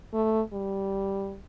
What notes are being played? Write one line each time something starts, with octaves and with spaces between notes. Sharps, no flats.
A3
G3